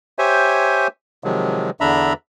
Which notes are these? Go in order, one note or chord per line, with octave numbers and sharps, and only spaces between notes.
G4 C5 C#5 E5 G#5
C3 D#3 F3 F#3 G#3
E2 D3 D4 E5 A#5 B5